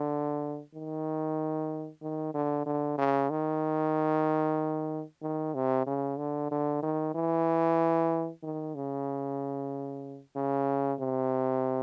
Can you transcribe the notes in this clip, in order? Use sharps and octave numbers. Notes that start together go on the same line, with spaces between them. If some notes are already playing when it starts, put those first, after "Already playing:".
Already playing: D3
D#3
D#3
D3
D3
C#3
D#3
D#3
C3
C#3
D3
D3
D#3
E3
D#3
C#3
C#3
C3